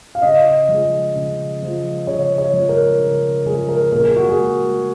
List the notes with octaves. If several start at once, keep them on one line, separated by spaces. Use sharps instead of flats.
F5
C#3 D#5
F3 G#3
C#3
F3 G#3
C#3 C#5
C#5
F3 G#3
A#4
C#3
F3 G#3 G#4
A#4
A#2 A#4
G#4
F#4
G#4
G#3